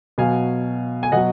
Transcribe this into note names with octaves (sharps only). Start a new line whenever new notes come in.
B2 F#3 F5 G#5
G#5
B2 F#3 D#5 F#5